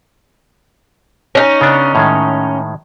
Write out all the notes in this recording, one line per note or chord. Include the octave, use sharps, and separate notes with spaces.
C#4 D#4
C#3 B3 D4
A2 D#3 G#3